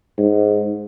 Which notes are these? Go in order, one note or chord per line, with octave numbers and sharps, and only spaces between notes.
G#2